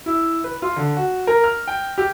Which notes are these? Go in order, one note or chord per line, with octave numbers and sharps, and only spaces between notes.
E4
B4
F4
D3
F#4
A#4
F6
G5
G4